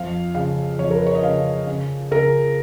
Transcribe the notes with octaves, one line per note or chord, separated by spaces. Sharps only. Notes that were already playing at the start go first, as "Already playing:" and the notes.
Already playing: F2 F5
C#3 F5
F2 C#5
A#4
B4
C#5
D#5
C#3 F5
C#3
C#3 A#4